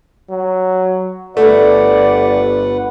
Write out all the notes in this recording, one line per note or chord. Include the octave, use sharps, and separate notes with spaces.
F#3
G1 A3 B4 D5 F#5